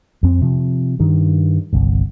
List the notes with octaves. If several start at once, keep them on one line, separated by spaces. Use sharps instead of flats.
F2 C4
C3 F3
G2 D#3
G1 C2